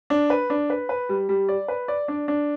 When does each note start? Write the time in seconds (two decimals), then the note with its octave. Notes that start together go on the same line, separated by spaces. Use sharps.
0.10 D4
0.30 B4
0.50 D4
0.70 B4
0.89 B4
1.09 G3
1.29 G3
1.49 D5
1.68 B4
1.88 D5
2.08 D4
2.28 D4